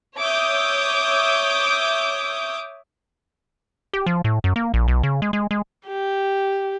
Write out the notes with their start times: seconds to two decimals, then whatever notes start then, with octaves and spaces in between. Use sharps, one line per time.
0.17 C#5 E5 D6 D#6 G6
3.93 G4
4.06 F3
4.24 A2
4.44 F#2
4.56 A#3
4.74 A#1
4.88 B1
5.03 C#3
5.22 G#3
5.33 G#3
5.51 G#3
5.87 G4